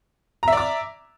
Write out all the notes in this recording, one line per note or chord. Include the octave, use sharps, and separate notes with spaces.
D5 E5 A#5 D6